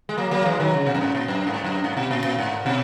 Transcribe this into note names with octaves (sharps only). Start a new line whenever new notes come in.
G#3
F#3 A#3
F#3 A#3
E3 G#3
D#3 F#3
C#3
B2
F#2
G#2
A#2
F#2
G#2
F#2
G#2
B2
A#2
A#2
G#2
B2